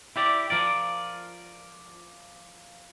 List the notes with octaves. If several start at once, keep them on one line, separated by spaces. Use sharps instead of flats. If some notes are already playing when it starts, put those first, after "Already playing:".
E4 G4 D5
F3 A#4 D5